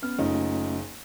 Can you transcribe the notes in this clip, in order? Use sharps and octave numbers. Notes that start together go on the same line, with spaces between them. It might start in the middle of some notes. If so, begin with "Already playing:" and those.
B3 C#4 F6
F#1 A3 C#4 D#4 F4